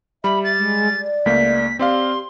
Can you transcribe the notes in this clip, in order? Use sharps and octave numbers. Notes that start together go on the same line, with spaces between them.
G3 E5 B5
A6
G#3
D5
C#2 A3 A#3 B6
C4 G4 D5 F5 C6